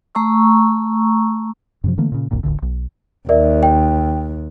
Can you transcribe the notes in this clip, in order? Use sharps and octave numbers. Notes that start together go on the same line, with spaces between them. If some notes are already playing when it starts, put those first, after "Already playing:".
A3 A#5 C#6 E6
F#2 C3 F3
D3 E3 A3 A#3
A#2 C#3
E1 C2 G2 A#2
D#1 A1 D2 D3
B1
D#2 A#4 D5 E5
G5